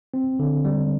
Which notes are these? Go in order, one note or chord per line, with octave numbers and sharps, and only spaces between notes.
C4
D3
G3